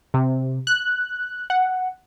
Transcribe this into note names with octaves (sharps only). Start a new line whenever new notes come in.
C3
F#6
F#5